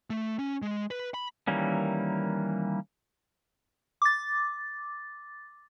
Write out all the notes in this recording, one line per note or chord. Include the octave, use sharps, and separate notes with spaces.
A3
C#4
G#3
B4
B5
D#3 E3 G3 A#3 C#4
D6 A6